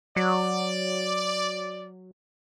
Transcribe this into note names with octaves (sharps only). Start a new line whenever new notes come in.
F#3 D5